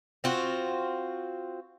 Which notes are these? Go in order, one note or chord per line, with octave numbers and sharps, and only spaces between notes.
C4 F4 F#4